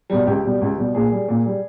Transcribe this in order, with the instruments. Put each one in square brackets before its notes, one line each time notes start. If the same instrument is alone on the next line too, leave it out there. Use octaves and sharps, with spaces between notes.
[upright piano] B2 G3
C#2 G4
B2 G3
C#2
B2 G3
A#2 G#4
G3
A#2
G3